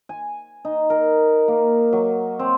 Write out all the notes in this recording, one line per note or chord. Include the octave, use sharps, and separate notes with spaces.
G#5
D#4
A#4
A#3
F#3
C4